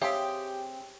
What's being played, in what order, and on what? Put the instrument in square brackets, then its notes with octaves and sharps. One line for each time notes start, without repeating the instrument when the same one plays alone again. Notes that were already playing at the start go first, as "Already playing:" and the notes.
[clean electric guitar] C4 G#4 [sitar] G4 [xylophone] C#5 E5 F5